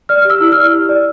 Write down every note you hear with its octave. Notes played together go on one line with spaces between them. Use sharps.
D5 F6
F6
G4 E6
E4
D5 F6
G4
D5